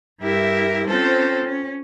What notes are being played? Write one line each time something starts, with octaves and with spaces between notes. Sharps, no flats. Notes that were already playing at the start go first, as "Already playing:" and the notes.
G2 E4 G4 A#4 E5
C4 C#4 F4 A4 C5
C#4